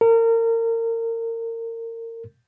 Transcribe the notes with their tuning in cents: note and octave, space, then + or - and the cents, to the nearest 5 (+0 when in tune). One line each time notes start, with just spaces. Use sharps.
A#4 -30